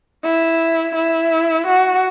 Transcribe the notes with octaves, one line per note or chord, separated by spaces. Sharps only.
E4
E4
F#4